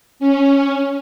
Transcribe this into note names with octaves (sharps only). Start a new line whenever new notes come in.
C#4